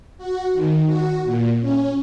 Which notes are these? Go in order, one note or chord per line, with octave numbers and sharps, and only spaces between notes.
F#4
D#3
F#4
A#2
C#4